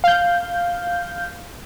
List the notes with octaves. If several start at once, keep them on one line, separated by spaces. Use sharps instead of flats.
F5 G6